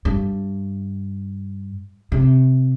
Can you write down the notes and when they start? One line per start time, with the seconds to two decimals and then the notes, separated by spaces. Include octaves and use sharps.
0.05 G2
2.12 C3